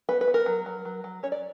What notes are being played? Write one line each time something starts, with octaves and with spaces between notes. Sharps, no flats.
B3 B4
B4
B3
A#4
F#3
F#3
F#3
F#3
C#4 C#5
D5